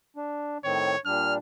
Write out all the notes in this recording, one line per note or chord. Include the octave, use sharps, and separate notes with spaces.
D4
A2 D#3 C4 C#5
A#2 G3 D4 F6